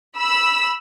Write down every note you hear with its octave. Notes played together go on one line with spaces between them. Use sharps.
B5 E6